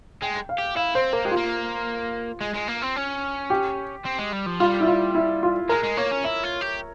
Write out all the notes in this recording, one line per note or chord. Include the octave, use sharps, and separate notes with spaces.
G#3 G5
F5
G4
E4 F5
C4 C5
A#3 A#4
G#3 G4
F4
A#3
G#3
G#3
A#3
C4
C#4
G4
C4
G#3
G3
F3
G3 F4
E4
F4
E4
F4
G#3 A#4
G#3
A#3 C#5
C#4
E4 E5
F4
G4